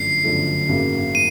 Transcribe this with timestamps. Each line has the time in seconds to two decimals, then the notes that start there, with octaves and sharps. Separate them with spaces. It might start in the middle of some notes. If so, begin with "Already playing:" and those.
Already playing: G1 F#2 D3 F3 A3 C7
0.23 G1 F#2 D3 F3 A3
0.68 G#1 F#2 C#3 F#3 A#3
1.15 D#7